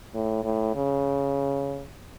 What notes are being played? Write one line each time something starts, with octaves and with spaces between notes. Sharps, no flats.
A2
A2
C#3